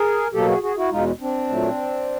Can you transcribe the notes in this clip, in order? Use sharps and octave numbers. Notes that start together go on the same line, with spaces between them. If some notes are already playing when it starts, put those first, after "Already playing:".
Already playing: G#4 A#4
B2 F#3 A#3 G4 A4
F#4 G#4
F#4 G#4
E4 F#4
E2 B2 G#3 D#4 F4
C4 D4
A#2 F#3 A3